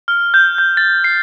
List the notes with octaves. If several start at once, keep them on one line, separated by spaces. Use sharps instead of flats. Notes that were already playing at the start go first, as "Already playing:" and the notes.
F6
G6
G6
A6
C7